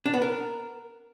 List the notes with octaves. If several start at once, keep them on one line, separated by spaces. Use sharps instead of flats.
D4
B3
A#4